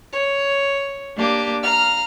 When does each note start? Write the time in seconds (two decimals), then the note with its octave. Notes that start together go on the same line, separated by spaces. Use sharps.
0.13 C#5
1.17 A#3 D4 G4
1.63 F5 A#5 F6